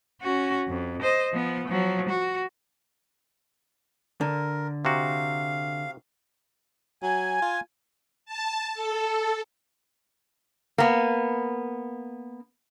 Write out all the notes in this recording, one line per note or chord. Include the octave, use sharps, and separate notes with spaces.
C#4 F#4
F2
C5 D#5
F3 B3
F3 F#3
F#4
D3 A#4
C3 F#4 F5
F#3 G#5
F4
A5
A4
A#3 B3